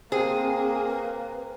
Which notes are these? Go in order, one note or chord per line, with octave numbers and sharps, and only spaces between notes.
A#3 C4 G#4 C5 G5
B4